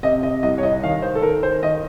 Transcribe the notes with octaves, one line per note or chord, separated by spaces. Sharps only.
C3 D#5
D#5
C2 D#5
C#5
D#5
D#3 F5
C5
A4
D#3 A#4
C5
D#3 D#5